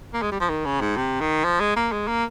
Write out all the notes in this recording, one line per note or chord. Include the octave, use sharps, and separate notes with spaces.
A#3
G#3
G3
F3
D#3
C#3
G#2
C3
D#3
F3
G#3
A#3
G#3
A#3